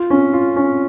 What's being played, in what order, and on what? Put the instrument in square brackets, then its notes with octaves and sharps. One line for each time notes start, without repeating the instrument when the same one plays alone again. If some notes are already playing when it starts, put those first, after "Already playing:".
Already playing: [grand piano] F4
C#4
F4
C#4